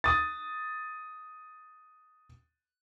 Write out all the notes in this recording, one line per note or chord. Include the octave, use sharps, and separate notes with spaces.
D#6 A6